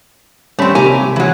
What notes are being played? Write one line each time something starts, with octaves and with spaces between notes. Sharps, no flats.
G3 A3 C4 C#4 B5
C3 G#3 A#3 G4 G#5 A#5
E3 F#3